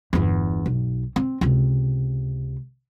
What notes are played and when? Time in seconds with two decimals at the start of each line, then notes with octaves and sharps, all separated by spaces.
0.13 G1 E2
0.66 B1
1.16 C4
1.41 C#2 C3